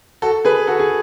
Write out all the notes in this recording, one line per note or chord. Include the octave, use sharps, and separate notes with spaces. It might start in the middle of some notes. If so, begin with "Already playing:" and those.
F#4 A4
G#4 B4
F#4 A4
G#4